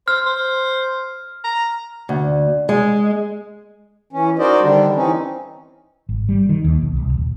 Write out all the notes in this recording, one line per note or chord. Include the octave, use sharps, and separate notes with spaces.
C5 F6
C5
A#5
D2
G#3
E3 C#4
D#4 F#4 A#4 C5 D5 D#5
D3 D#3 G3 D4
E3 C4 C#4 D#4
G#1
G3
D#3
D#2
B1
C2
D#1